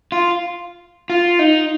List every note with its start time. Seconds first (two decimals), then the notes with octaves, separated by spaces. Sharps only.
0.12 F4
1.10 F4
1.39 D#4